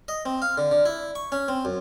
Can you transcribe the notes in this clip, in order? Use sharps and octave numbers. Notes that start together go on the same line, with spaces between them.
D#5
C4
F5
D3
D3
E4
C#6
C#4
C4
F#2